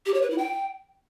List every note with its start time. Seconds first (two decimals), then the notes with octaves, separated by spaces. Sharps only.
0.06 G4
0.14 C#5
0.22 B4
0.30 E4
0.38 G5